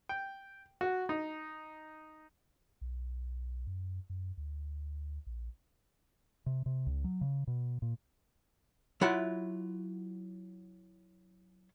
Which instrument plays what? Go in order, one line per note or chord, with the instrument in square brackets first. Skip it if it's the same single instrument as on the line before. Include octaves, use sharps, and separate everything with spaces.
[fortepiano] G5
F#4
D#4
[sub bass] B1
F#2
F#2
D2
A#1
[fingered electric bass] C3
C3
C#2
F#3
C#3
B2
A#2
[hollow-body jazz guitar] F#3 E4 F4 E5 F#5